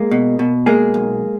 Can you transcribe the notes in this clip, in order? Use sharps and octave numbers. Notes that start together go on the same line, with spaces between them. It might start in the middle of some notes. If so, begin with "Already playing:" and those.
Already playing: G#3 A#3 G#4
B2
B2
G#3 A#3 G#4
B1